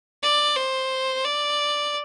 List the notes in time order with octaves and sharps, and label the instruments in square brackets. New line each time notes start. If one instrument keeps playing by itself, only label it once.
[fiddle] D5
C5
D5